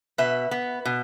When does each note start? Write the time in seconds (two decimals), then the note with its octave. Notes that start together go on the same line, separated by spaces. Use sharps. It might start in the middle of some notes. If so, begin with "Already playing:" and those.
0.18 B2 B4 E5
0.51 B3
0.85 B2